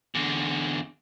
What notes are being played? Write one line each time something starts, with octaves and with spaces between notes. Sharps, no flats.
E2 D3